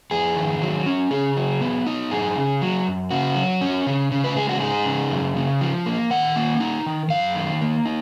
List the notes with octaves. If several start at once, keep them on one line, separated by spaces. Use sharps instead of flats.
F2 G#4
D#3
F#3
C#4
C#3 G#4
F#3
B3
D#4
F#2 G#4
C#3
F#3
F#2
C#3 F#4
F#3
C#4
C#3
C#3
B4
G#3 G#4
F#4
D#4 G#4
C#3
F#2
C#3
F3
A#3
D#3 F#5
A#3
D#4
D#3
F#2 F5
D#3
A#3
D#4